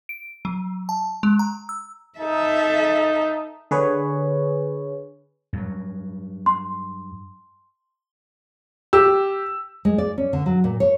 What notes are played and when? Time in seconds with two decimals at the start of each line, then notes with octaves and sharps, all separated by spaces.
0.09 D7
0.45 F#3
0.89 A5
1.23 G#3
1.39 A#5
1.69 E6
2.19 D#4 A4 E5
3.71 D3 G#4 B4 C#5
5.53 G2 F#3
6.46 C6
8.93 G4 E6
9.85 G#3
9.98 D5
10.18 C#4
10.33 D3
10.46 F#3
10.64 A#2
10.80 C#5